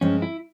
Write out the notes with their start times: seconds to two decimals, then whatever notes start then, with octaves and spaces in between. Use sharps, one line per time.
0.01 G2 F3 G#3 C4 C#4 F4
0.22 E4